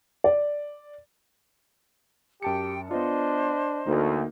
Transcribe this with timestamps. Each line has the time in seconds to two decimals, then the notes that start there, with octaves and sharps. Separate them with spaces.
0.24 D5
2.42 F#2 G4 G5 A5 C#7
2.91 B3 D4 F4 C5 D#5
3.86 D2 A#3 D#4